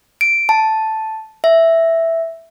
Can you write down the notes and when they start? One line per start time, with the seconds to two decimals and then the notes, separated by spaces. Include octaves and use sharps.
0.21 D7
0.49 A5
1.44 E5